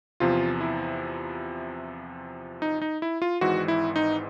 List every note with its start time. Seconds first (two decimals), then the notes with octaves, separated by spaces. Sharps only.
0.20 E2 C3 F3 F4
0.61 E4
2.62 D#4
2.82 D#4
3.02 E4
3.22 F4
3.41 G#1 G#2 E3 F#4
3.68 E4
3.96 D#4